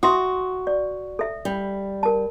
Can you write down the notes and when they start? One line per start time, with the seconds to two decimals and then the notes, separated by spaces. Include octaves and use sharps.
0.03 F#4 E5 C6 D#6
0.67 D5
1.19 A4 E5
1.45 G3
2.03 A#4 A5